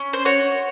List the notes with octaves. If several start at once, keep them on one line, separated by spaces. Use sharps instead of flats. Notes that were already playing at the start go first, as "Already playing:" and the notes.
Already playing: C#4
C5
F#4 C#5